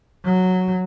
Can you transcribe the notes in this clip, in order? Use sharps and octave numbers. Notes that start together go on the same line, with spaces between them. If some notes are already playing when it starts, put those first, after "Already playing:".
F#3